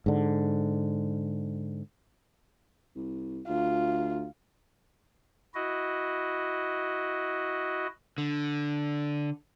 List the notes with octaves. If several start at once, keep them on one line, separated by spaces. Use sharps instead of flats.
G#2 D3
C2
D2 F4
E4 F#4 D#5
D3